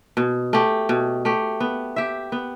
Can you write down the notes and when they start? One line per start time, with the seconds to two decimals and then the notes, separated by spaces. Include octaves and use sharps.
0.17 B2
0.53 A3 G4
0.89 B2
1.25 A3 G4
1.60 B3
1.96 G4 E5
2.32 B3